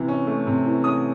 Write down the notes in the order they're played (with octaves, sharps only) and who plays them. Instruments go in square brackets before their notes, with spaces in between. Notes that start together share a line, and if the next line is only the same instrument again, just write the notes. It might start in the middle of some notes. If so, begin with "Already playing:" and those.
Already playing: [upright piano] C3 E3
C#4
A3
C3
E3
C#4 D#6